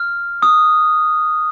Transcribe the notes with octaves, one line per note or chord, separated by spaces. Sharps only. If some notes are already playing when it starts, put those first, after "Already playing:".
Already playing: F6
D#6